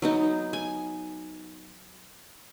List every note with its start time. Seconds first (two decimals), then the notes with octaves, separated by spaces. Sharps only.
0.02 F#3 B3 D#4
0.53 G#5